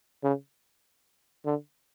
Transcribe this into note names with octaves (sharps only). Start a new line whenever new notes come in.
C#3
D3